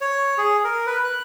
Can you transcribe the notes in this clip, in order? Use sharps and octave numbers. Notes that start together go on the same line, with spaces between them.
C#5
G#4
A#4
B4
F#6